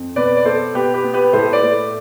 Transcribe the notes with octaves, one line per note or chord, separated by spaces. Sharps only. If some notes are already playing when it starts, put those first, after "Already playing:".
Already playing: F2
B2 B4 D5
D5
B3 A4 C5
B2 G4 B4
G4 B4
B3
G4 B4
A2 A4 C5
B4 D5
A3